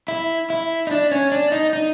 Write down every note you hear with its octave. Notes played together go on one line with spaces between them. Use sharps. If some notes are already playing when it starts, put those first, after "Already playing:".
E4
E4
D#4
D4
C#4
D4
D#4
D#4